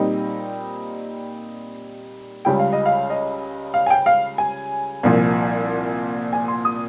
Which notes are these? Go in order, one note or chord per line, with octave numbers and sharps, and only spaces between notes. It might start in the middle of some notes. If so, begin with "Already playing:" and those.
Already playing: A#2 G3 C4 D#4 D#5
C#2 C#3 G3 G5
F5
D#5
F5
D#5
F5
G#5
G5
F5
G#5
C2 A#2 F3
G#5
C6
D#6